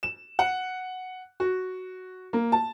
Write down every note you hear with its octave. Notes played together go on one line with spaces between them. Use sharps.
E7
F#5
F#4
A#3
A5